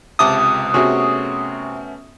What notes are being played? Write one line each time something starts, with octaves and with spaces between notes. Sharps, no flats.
C#2 C3 E5 A5 D6 D#6 D#7
C3 A3 B3 C#4 F#4 G#4